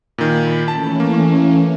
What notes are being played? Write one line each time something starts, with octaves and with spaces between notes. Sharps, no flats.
A#2 D#3 B5
E3 A3 C#4 A5
A#3